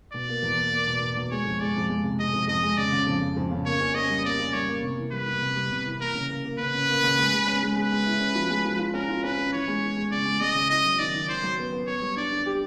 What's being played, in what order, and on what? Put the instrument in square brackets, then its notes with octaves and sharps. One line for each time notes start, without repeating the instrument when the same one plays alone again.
[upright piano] B2 [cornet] D5
[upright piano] A#3
E2
A#3
A#3
B2
B2
B2
[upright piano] G#3 [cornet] C#5
[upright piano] F2
[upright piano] G#3 [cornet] D5
[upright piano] F2
G#3
C3
[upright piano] G#3 [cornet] D#5
[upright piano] F2
[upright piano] F2 [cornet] D#5
[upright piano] G#3
[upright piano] C#3 [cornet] D5
[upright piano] C#3
F2
C#3
F2
C#3
[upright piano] A#3 [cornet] C#5
[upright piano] C#4
[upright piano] C#4 [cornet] D#5
[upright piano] G3
[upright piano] A#3 [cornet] D5
[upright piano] C#4
[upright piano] G3 [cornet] C#5
[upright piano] A#3
C3
E3
[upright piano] G3 [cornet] B4
[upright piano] G3
C3
G3
C3
E3
[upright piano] A#3 [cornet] A#4
[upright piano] C#3
A#3
A#3
[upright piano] C#3 [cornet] B4
[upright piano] C#3
A#3
C#3
G#3
G#3
C#4
G#3
[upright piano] G#3 [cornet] B4
[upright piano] G#3
E4
C#4
F3
G#3
F3
F4
[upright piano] C#4 [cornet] A#4
[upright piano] F4
[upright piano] C#4 [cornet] B4
[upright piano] C#4
[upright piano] E3 [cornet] C#5
[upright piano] G#3
E3
G#3
[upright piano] C#3 [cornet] D5
[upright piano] G#3
[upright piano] G#3 [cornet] D#5
[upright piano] C#3
[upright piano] E4 [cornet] D#5
[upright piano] F#3
[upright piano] D#3 [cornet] D5
[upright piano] D#3
[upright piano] D#3 [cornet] C5
[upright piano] F#3
B3
B3
[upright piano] B3 [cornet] C#5
[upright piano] G3
[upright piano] D4 [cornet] D5
[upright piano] D4
G4